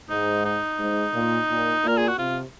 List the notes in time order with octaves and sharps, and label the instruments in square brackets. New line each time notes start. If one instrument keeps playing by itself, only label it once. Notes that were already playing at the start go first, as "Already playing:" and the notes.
[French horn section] G#2 [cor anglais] D#4
[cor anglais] D#4
[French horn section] G#2
A#2
A#2
[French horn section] A#2 [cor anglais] A#4
[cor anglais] G#4
F#4
[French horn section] C3 [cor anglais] F4